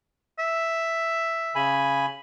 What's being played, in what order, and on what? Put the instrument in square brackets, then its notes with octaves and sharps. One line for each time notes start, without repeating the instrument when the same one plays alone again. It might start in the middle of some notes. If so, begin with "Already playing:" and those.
[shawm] E5
[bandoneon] C#3 G#5 B5